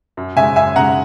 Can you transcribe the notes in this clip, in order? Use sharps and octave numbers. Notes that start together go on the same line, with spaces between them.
F#2
C#3 G#3 E5 G#5
F#2 E5 G#5
C#3 G#3 F#5 A#5